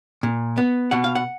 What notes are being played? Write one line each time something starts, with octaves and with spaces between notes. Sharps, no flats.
A#2
B3
B2 F#5
F5
F#5